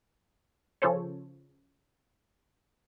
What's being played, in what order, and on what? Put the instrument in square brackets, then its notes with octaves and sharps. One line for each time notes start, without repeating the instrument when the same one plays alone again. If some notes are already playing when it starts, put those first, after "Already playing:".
[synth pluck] C#3 F3 C#4 A4 C5 C#5